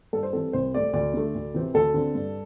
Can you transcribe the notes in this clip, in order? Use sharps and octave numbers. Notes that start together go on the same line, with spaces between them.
G2 A4
C5
E3 G3 C4 A4
C2 C5
C3 A3 C4 D5
D2 D5
D3 A3
D2
C3 E3 C4
D2 A4
D3 C4
G2